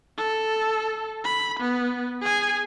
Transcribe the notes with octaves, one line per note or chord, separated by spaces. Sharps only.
A4
B5
B3
G#4 G#5